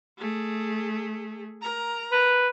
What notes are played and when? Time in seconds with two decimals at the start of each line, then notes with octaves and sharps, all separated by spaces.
0.18 A3 G#4
1.62 A#4 A#5
2.12 B4